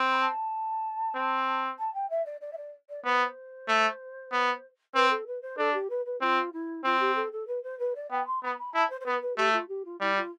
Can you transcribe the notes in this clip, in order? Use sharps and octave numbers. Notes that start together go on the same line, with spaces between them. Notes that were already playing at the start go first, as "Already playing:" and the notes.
Already playing: C4
B5
A5
C4
A5
G5
E5
D5
D5
E5
D5
D5
B3 C5
A3
B3
C4 B4
A4
B4
C5
D4 A4
G4
B4
B4
C4 F4
E4
C4 F4
G4
A4
A4
B4
C5
B4
D5
B3 G5
C6
B3 B5
B5
E4 A5
C5
C5
B3 B4
B4
A3 G4
F4
G4
F4
G3 E4
F4